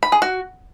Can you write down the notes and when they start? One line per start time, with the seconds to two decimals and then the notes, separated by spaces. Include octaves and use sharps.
0.03 B5
0.12 G#4
0.22 F#4